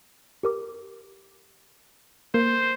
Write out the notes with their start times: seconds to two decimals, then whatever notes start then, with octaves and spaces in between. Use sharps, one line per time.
0.43 G4 A#4 D6
2.34 A#3 A#4 C5